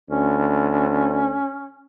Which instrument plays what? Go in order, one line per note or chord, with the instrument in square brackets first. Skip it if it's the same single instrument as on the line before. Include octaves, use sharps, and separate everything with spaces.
[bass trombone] D2 [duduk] C#4